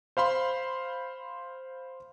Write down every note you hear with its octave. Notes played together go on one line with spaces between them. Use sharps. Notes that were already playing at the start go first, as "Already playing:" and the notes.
C5 F5 B5 C6